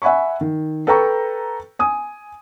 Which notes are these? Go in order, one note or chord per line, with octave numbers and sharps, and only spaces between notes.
E5 F#5 G#5 B5 C#6
D#3
A4 B4 G5 A#5 C#6
G#5 D#6